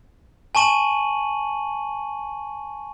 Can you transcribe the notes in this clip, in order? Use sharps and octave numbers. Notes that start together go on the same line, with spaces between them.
G#5 A5 C#6 D#7 F#7